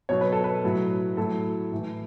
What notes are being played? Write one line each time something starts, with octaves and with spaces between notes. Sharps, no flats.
B2 F#3 C#5
B4
A4
B4
A2 F#3
A2 F#3 A4
A2 E3